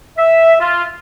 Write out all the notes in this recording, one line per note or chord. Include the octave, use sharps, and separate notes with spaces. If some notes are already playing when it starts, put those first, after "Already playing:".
E5
F4